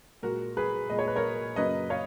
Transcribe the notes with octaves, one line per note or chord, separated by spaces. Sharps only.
A#2 G#3 F#4 A#4
G#4 B4
A#2 G#3 D#5
C#5
B4
A#4 C#5
F#2 C#3 F#3 A#3 B4 D#5
C#5 F5